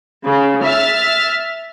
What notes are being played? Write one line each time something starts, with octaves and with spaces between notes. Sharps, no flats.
C#3
E5 F6 A6